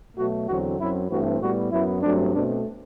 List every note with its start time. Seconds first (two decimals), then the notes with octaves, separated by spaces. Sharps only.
0.17 B2 F#3 A3 F#4
0.48 E2 D3 F#3 C4 F#4
0.79 F#2 F#3 C4 E4
1.09 G2 E3 A3 C4 F#4
1.40 A2 G3 B3 F#4
1.71 F#2 F#3 B3 E4
2.02 G2 F#3 A3 C4 D4
2.33 B2 A3 C4 D4